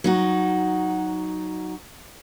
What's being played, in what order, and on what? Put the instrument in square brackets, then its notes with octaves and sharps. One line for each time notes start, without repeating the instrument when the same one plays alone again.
[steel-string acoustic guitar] F#3 D#4 F#4